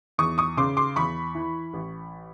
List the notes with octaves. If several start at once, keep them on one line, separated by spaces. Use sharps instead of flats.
E2 C#6 D#6
C#6 D#6
C#3 C6 D6
C6 D6
E2 B5 C#6
E3
A1